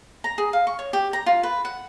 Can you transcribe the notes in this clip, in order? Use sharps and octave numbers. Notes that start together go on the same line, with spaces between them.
A#5
G#4
F5
C#6
C#5
G4
A#5
F4
B4
F#5